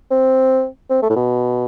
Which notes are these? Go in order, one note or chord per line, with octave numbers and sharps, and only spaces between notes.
C4
C4
A3
A2
B2